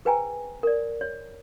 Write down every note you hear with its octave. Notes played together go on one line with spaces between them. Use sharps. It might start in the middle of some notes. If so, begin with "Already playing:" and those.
G#4 B4 C5 G5 G#5 A#5
A#4 D5
C#5